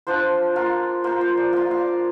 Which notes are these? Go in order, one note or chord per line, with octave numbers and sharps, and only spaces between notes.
F3 D4 F4 C5
A#3 F4
A#3 F4 C5
C5
D5
A#3 F4 F5
F5
D5